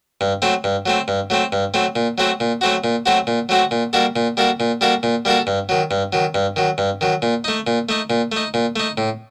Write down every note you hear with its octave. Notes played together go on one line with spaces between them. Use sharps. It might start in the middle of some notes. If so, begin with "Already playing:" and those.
G2
F#3 A3 C4
G2
F#3 A3 C4
G2
F#3 A3 C4
G2
F#3 A3 C4
A#2
F#3 A3 C4 F#4
A#2
F#3 A3 C4 F#4
A#2
F#3 A3 C4 F#4
A#2
F#3 A3 C4 F#4
A#2
G3 A#3 F#4 A4
A#2
G3 A#3 F#4 A4
A#2
G3 A#3 F#4 A4
A#2
G3 A#3 F#4 A4
G2
D#3 F#3
G2
D#3 F#3
G2
D#3 F#3
G2
D#3 F#3
A#2
A3 D#4
A#2
A3 D#4
A#2
A3 D#4
A#2
A3 D#4
A2